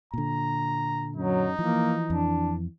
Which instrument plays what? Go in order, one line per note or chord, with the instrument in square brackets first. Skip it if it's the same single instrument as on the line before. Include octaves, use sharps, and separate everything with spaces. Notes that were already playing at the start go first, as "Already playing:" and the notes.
[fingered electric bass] A#2 D3 [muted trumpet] A#5
[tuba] F#2 [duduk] F#3 [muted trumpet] D#4
[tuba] E3 [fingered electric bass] F3 [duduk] A#3
[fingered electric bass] F2 [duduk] D4